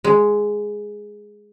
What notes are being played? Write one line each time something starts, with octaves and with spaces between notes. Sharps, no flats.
G#3